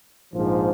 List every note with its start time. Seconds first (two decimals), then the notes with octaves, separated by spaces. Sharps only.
0.33 A#1 G#2 F3